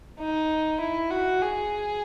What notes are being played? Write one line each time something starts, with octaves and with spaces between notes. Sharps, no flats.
D#4
E4
F#4
G#4